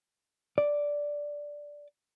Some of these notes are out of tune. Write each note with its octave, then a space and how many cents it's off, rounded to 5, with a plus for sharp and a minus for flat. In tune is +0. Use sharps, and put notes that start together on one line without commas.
D5 -5